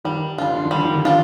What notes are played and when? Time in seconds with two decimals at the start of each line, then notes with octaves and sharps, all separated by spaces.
0.05 D#3 G3
0.38 D3 D4 F4
0.55 D3
0.65 D#3
0.71 D3 G3
0.85 D#3
0.94 D3
1.04 D#3 D4 F4